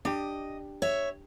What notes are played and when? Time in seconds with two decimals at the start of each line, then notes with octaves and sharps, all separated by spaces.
0.05 D4 G4 D#5
0.82 C#5 E5